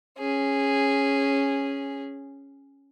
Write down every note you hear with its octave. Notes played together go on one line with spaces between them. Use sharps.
C#4 G#4